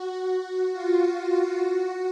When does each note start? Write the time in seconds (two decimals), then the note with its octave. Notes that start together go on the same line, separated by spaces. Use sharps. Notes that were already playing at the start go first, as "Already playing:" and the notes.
Already playing: F#4
0.72 F4
1.57 F#4